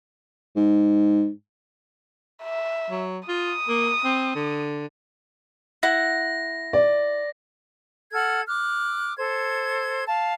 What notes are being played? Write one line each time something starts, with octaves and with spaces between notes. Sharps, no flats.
G#2
E5
F#3
F4 D#6
A#3
C4
D3
E4 F#5 A#6
D5
A4 F#5 F6 G#6
D6 F6 F#6
A4 C5 G#6
F5 A5